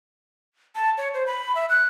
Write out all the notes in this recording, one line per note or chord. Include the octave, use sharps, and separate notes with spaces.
A5
C#5
C5
B5
E5
F#6